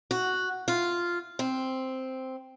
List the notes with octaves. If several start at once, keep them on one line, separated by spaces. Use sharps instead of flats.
F#4
F4
C4